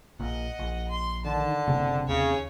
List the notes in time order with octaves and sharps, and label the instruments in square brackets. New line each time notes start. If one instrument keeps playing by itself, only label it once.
[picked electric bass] A#1 A#2 [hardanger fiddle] D#5 F#5
[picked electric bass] A#1
[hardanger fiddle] C6
[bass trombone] D3 [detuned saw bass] D#3 [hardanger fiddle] A5
[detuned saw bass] F#1 [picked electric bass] C3 C4
[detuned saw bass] D#2 [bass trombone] C#3 [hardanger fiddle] C#5